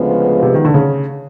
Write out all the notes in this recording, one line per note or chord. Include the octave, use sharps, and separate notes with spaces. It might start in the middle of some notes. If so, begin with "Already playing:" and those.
Already playing: D2 C#3 F3 G#3 B3
C3
D#3
D3
C#3